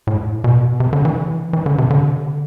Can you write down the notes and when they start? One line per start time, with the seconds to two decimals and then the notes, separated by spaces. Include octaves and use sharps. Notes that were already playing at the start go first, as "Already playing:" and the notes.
0.07 A2
0.44 B2
0.80 C3
0.93 D3
1.05 E3
1.53 E3
1.66 D3
1.78 C3
1.90 D3